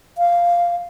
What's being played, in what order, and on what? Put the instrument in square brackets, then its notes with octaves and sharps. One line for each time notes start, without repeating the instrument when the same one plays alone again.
[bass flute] F5